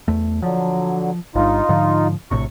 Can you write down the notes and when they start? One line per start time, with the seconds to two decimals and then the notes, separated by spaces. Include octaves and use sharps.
0.08 E2 A3
0.42 D3 F3 F#3
1.35 G1 G2 D#4 F4
1.69 G#2 D3 F3
2.31 A#1 A2 C3 C#6